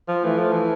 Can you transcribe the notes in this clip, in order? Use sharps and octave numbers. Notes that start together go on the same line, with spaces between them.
F3
E3 A3
F3
E3